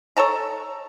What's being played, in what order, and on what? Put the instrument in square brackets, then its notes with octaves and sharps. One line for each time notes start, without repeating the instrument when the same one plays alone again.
[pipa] A4 C#5 A5 A#5